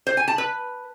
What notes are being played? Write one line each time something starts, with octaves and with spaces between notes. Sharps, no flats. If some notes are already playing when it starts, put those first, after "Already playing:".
C5
G#5
A5
B4